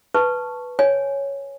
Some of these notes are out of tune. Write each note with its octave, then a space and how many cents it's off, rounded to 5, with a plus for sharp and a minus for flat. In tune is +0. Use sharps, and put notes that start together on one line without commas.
B4 +0 A5 +0 C#6 +0
C#5 +0 G#5 +0